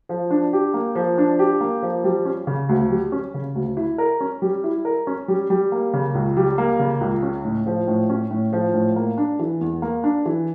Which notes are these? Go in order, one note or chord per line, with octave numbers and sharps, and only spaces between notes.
F3
D4
G4
A#3
F3
D4
G4
A#3
F3
G3
C#4
C#3
D2
G3
C#4
C#3
D2
E4
A#4
C#4
G3
E4
A#4
C#4
G3
G3
A#3
C#3
C#2
G3
A#3
C#3
C#2
C#4
A2
F3
A2
C#4
A2
F3
A2
A#3
D4
E3
E2
A#3
D4
E3